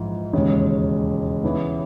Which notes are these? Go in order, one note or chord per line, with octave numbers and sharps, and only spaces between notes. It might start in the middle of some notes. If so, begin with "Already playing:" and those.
Already playing: A#1 G#2 E3
E1 D#2 C#3 G#3 C#4
C#3 E3 B3